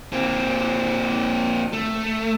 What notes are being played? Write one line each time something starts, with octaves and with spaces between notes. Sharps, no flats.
A#2 C4
A3